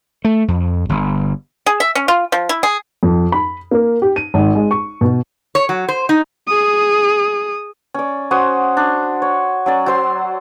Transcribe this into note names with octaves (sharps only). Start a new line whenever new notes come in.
A3
F2
G1
G#4
E5
C#4
F4
F3
E4
G#4
F2
B5
A#3
G4
D#7
G#1
G#3
C#6
B2
C#5
F#3
C5
D#4
G#4 D#6
C#4 D5
C#4 F#4 C5 D#6
D4
C#5
F#3 C#4 D5
F#3 C5 C6